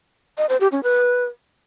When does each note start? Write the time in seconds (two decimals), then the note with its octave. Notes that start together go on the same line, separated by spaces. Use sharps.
0.38 D#5
0.49 C5
0.60 G4
0.72 C#4
0.83 B4